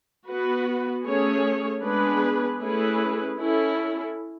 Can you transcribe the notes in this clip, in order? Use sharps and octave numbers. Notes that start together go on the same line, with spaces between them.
B3 F#4 B4
A3 C#4 G#4 C#5
G#3 B3 D4 G#4 B4
A3 C#4 E4 G#4 B4
C#4 E4 A4